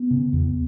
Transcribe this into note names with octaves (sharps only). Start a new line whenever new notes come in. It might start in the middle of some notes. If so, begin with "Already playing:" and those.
Already playing: B3
C#3
E2